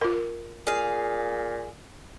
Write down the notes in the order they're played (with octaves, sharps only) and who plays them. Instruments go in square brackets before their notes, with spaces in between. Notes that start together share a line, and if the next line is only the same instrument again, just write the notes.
[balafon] F4 A#4
[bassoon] A#2 [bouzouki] G#4 F5